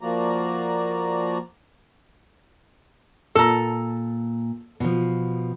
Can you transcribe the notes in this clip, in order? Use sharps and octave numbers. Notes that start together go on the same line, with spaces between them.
F3 A#3 F#4 D5 A#5
A#2 A4 A#5
B2 F3